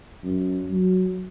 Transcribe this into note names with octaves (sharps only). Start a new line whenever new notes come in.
F#2
F#3